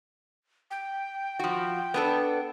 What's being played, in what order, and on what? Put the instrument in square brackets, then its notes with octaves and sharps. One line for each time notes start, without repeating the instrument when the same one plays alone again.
[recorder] G5
[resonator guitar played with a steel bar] F3 F#4
B3 D4 A4